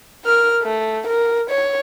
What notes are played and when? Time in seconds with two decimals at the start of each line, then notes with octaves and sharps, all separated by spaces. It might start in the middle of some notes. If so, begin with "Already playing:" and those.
0.25 A#4 F6
0.62 A3
1.07 A#4
1.50 C#5